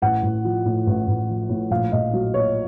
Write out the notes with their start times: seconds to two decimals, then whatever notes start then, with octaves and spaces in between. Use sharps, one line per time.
0.02 A1 F#5
0.23 A1
0.45 F3
0.65 A2
0.87 A1
1.07 A1
1.29 F3
1.49 A2
1.70 A#1 F5
1.92 A#1 D#5
2.13 F#3
2.34 A#2 C#5